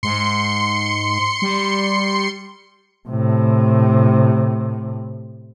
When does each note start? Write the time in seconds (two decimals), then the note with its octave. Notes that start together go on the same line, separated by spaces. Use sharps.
0.03 G#2 C6 C#7
1.42 G3
3.09 A2 C3